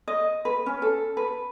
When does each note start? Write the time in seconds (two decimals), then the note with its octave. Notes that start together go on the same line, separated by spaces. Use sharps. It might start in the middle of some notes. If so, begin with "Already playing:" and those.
0.08 D#5
0.45 B4
0.66 C#4
0.82 A4
1.17 B4